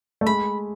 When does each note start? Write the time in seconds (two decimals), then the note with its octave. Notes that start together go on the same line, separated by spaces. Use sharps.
0.21 A3
0.26 G#3 B5